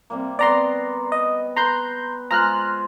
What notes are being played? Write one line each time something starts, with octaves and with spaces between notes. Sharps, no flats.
C3 G3 A#3
B3 B4 D5 A#5 C6
D#5
B4 A#5 C6 G6
G#3 F4 C5 A#5 F6 F#6